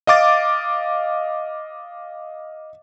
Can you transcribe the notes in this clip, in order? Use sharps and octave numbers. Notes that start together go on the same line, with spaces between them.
D#5 F5 D6 A6